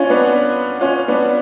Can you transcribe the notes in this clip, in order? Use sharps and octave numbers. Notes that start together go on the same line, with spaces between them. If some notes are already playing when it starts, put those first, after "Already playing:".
Already playing: C#4 D4 F4
B3 D4
C#4 F4
B3 D4